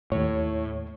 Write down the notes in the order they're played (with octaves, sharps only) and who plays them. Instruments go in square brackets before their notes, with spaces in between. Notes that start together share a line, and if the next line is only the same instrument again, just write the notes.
[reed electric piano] D#2 C#5 [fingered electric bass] A2